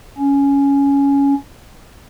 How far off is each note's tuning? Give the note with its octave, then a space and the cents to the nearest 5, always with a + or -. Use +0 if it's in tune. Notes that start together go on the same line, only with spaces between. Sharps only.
C#4 +10